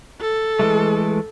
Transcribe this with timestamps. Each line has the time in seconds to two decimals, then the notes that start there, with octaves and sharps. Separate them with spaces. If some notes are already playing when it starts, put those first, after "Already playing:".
0.21 A4
0.60 E3 G#3 A3